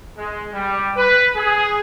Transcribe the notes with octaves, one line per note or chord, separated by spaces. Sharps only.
G#3
G3
B4
G#4